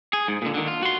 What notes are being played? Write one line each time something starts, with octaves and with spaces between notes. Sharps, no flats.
G#4
G#2
A#2 D3
D3 D#3
F4
F#4 C6